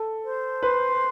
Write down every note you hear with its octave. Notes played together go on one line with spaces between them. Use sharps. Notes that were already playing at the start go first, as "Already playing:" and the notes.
Already playing: A4
C5
B4 C6